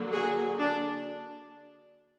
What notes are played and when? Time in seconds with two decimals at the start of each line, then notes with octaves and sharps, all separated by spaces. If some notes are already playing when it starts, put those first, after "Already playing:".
Already playing: D3 F#3 A#3
0.11 F#4 G#4
0.59 D4